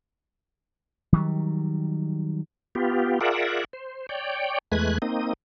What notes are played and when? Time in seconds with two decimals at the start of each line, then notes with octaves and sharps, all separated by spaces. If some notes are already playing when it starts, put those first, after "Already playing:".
1.13 D#3 F#3 G3
2.75 B3 F4 G4
3.21 F4 G#4 A#4 D5 E5 F#5
3.73 C5
4.09 C#5 D5 G5
4.72 E2 G#3 A3 B4 F#6 G#6
5.02 A#3 C4 D#4 D#6